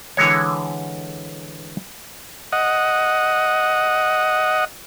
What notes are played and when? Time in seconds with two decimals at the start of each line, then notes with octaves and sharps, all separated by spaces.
0.17 D3 E3 G#3 C#5
2.52 D#5 F#5